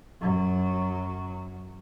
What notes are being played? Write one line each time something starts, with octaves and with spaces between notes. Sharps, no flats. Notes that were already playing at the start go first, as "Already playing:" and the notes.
F#2 F#3